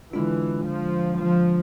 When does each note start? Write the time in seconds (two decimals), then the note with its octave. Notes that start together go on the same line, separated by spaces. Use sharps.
0.13 D3 E3 G#3 D4 F4
0.67 F3
1.19 F3